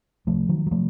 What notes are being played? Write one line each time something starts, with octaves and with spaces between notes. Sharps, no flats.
C2 C3 F3 A3
D#3 F#3
F#3
C3 F3 A3